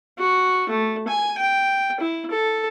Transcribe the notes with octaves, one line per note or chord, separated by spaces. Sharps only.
F#4
A3
G#5
G5
E4
A4